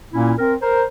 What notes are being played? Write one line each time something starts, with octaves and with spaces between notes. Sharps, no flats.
A#2 A#3 C#4 E4
C4 A#4
A#4 C5